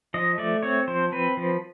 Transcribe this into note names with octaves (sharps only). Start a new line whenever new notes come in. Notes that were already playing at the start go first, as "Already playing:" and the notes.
F3 D#5
A3 D5
C4 C#5
F3 C5
C4 B4
F3